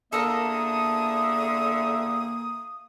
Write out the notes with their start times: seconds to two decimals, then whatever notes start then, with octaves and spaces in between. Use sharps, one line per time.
0.13 E2 D3 A#3 A4 A#4 E5 A#5 D#6